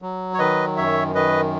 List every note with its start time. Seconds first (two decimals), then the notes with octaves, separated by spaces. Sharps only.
0.02 F#3
0.34 C#5
0.39 D#3 B4 D#5
0.77 F#2 C#5 E5
1.15 D#3 B4 D#5